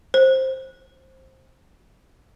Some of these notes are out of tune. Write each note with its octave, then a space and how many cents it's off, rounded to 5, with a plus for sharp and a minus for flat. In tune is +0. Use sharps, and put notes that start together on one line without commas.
C5 +15